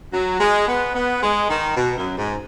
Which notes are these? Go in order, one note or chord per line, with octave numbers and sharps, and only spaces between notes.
F#3
G#3
B3
B3
G#3
D#3
B2
F#2
G#2